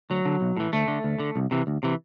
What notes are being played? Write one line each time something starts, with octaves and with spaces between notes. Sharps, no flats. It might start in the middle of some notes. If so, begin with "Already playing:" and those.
D2 F#3
D3
B1
A2 E3
D2 A3
D3
D2
D3
C2
C3 E3
D2
C3 E3